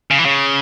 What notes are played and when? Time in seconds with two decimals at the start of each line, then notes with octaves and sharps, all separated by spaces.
0.11 C#3
0.19 E3
0.26 C#3